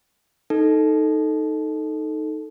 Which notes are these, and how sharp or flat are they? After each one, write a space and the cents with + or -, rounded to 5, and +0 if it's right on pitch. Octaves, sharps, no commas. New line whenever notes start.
D#4 +0 A4 +0